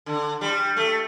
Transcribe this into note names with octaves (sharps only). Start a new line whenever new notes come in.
D3
G3
A3